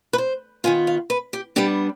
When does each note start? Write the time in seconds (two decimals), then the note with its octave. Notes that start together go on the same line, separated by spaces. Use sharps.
0.13 B4
0.18 C5
0.64 D#3 B3 F4 G#5
0.87 F5
1.10 B4
1.33 G4
1.56 G3 B3 D4 G4